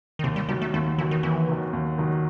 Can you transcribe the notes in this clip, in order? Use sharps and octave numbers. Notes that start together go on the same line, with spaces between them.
D#3
D#2 C3
G3
D#3 F#3 G3
A3
D#2 A3
D#3 E3 F#3
D#3
D#2 E3
D#3 F#3
D#2
D#3 F#3